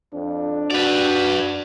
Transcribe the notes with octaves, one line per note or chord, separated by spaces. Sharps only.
F2 D4
F#4 B4 D5